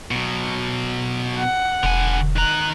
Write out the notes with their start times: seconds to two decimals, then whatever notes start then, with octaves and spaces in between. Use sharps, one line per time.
0.11 B2 F#3
1.38 F#5
1.83 E1 D3 G#5
2.36 D#3 A#5 F#6